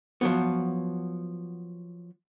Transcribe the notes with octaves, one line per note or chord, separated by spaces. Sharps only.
F3 F#3 B3